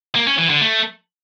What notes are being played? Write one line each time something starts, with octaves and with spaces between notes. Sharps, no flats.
A#3
C#4
E3
D3
A3